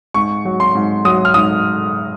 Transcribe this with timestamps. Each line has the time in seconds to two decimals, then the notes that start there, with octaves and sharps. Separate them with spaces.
0.14 G#2 C#6
0.45 F#3
0.60 C6
0.75 G#2
1.05 F#3 D#6
1.25 F6
1.34 G#2 D#6